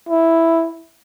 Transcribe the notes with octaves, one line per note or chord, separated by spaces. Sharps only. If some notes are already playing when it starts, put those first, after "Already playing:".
E4